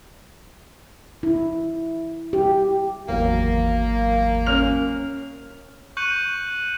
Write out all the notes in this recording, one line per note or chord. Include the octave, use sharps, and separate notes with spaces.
E4
G4
G#1 E2 F#3 A#3
C#4 F6 F7
C#6 F#6 G6 C#7 D#7 F#7